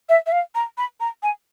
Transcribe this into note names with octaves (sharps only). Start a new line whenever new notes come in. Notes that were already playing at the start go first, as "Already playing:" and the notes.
E5
E5
F5
A#5
B5
A#5
G#5